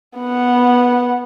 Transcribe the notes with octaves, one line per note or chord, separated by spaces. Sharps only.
B3 F#5